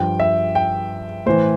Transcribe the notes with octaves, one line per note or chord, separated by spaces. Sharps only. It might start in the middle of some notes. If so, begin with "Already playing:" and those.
Already playing: G2 F3 G5
E5
G5
A2 E3 C5